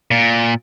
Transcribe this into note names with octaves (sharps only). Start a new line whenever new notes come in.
A#2